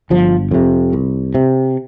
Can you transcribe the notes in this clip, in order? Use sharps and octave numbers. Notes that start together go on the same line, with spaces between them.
G1 F3
F2 C3
C2
C3